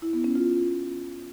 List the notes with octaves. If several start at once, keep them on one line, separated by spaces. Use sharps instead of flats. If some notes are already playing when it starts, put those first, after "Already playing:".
E4
B3
C#4
F4